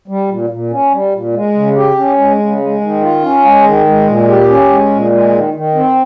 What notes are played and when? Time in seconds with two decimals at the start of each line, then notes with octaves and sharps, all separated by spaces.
0.08 G3
0.29 A#2
0.50 A#2
0.71 C#4
0.92 G3
1.13 A#2
1.33 G#3
1.55 C#3
1.76 G4
1.97 C#4
2.18 G#3
2.39 C#3
2.60 G#3
2.81 D#3
3.02 F4
3.23 C#4
3.44 G#3
3.65 D#3
3.86 G#3
4.07 A#2
4.28 G4
4.49 C#4
4.70 G#3
4.91 A#2
5.11 G#3
5.33 D#3
5.54 D#3
5.75 C4